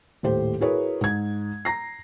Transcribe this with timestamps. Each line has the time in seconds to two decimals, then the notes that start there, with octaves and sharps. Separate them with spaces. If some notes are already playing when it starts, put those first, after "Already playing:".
0.23 D#1 A2 G4 C5
0.61 E4 F#4 G#4 A#4 B4 C#5
1.01 G#2 G#6
1.65 A#5 A#6 C7